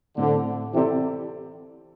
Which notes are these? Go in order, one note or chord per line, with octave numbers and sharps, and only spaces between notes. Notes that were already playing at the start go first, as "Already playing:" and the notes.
A2 D3 A3 C4
C3 E3 C4 E4 A4 D5